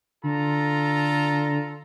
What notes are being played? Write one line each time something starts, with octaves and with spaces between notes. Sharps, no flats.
D3 F4 A4 A#5